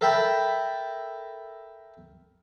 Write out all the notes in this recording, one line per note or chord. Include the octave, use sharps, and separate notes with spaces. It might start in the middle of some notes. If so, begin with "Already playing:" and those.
A4 A#4 E5 G5 A5 B5